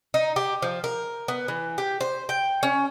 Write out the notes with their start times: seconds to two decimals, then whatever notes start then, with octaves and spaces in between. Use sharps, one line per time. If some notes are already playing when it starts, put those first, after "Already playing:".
0.14 D#4
0.36 G4
0.62 F3
0.84 A#4
1.28 B3
1.48 E3
1.78 G4
2.01 C5
2.29 G5
2.63 C#4